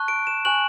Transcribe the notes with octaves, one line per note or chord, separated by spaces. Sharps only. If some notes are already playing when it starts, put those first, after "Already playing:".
Already playing: A5 C#6 F#6
D7
E7
G#5 C#6 F#6 F#7